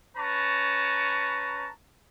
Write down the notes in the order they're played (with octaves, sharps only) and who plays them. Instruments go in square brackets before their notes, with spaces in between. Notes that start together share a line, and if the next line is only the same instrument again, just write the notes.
[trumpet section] C#4 B4 A5 A#5 C#6